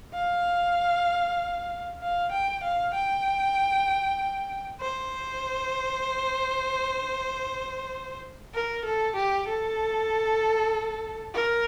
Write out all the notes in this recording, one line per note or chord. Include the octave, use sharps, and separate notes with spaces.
F5
F5
G5
F5
G5
C5
A#4
A4
G4
A4
A#4